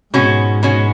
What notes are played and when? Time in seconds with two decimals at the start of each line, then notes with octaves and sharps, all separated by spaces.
0.14 G#2 B2 G#3 C#4 F#4
0.63 B2 G#3 C#4 F#4